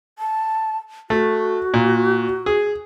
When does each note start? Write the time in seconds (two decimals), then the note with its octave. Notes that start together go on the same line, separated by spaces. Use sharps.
0.19 A5
1.10 A3 F#4
1.74 A#2
2.46 G#4